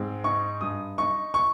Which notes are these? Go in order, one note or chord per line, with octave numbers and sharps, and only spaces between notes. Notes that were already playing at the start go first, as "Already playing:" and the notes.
Already playing: G#2 C4
D#4 C#6
G2 D#6
D#4 C#6
C#6